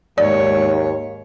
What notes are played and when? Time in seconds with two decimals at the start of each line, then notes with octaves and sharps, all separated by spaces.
0.18 D#2 G#2 C#5 D5